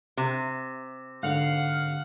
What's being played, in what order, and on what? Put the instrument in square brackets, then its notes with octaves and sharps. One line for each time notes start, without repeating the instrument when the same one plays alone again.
[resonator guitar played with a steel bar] C3
[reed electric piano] G#2 D3 [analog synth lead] F5 [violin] F#5